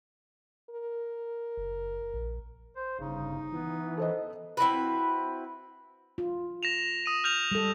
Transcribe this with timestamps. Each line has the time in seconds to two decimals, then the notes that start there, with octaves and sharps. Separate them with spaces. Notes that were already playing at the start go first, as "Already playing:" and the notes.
0.70 A#4
1.57 F#1
2.14 A#1
2.76 C5
2.99 G1 C#3 D#4
3.52 E3 B3
3.97 A4 C5 D#5
4.57 C4 E4 F#4 B4
6.18 F4
6.63 A#6 E7 F7
7.06 D#6 D#7
7.24 F6 G6 F7
7.51 G3 A4